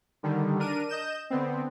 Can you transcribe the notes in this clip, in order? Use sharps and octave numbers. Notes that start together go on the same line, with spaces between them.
D3 D#3 G3
D4 A#4 D#7
D#5 G6 E7
D3 B3 C4